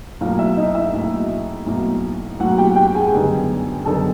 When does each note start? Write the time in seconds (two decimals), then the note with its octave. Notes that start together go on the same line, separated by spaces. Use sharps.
0.21 B1 A2 F#3 A#3 F4 F5
0.39 E4 E5
0.57 D#4 D#5
0.75 E4 E5
0.93 B1 A2 F#3 A#3
1.66 B1 A2 F#3 A#3
2.39 B1 A2 F#3 A#3 F#4 F#5
2.58 G4 G5
2.76 G4 G5
2.95 G#4 G#5
3.12 F#2 D3 G3 B3 D#4
3.85 F#2 D3 G3 B3 D#4 A4 A5